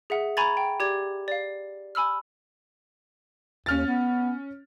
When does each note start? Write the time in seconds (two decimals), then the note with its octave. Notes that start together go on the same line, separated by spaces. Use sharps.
0.10 G#4 E5 F#5
0.37 G#5 A#5 B5 C#6 G#6 A6
0.57 G5
0.80 G4 D5 G#6
1.28 D5 F5
1.95 G#5 B5 E6 F6
3.66 D#2 C#4 F6 A6
3.87 B3